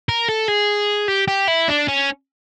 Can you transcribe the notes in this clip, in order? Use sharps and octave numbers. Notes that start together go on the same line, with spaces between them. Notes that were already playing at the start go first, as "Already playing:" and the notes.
A#4
A4
G#4
G4
G4
E4
D4
C#4